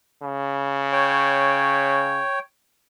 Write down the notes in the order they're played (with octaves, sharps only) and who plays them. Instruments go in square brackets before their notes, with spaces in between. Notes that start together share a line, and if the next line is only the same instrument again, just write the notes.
[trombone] C#3
[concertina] C#5 G5